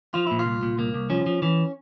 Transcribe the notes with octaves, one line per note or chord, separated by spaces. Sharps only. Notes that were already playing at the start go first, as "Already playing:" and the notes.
F3 F4
A#2 E4
F4
C2
A#2
C2 A#3
C2
F3 C#4
F3
E3 C#4